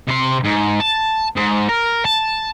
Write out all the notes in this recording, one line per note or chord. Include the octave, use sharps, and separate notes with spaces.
C3 C6
G#2
A5
G#2
A#4
A5